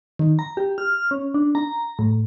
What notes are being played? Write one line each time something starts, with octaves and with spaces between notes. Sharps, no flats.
D#3
A#5
G4
F6
C#4
D4
A#5
A2